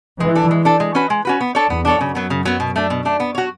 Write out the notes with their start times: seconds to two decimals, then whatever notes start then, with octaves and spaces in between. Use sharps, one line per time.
0.20 E3 G#3
0.35 D4 A4
0.51 G#3
0.65 D4 A4
0.80 G#3
0.95 C#4 F#4 B4
1.10 G#3
1.25 C#4 F#4 B4
1.40 B3
1.55 D4 A4 C#5
1.70 E2 B3
1.85 D4 A4 C#5
2.00 F#2 C#3
2.15 F#3 B3
2.30 C#3
2.45 F#3 B3
2.60 B2
2.76 A3 D4
2.90 B2
3.05 A3 D4
3.20 B3
3.35 F#4 C#5